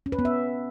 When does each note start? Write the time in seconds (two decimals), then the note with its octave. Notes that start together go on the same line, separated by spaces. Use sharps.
0.06 C#4
0.12 B4
0.19 B3
0.25 E5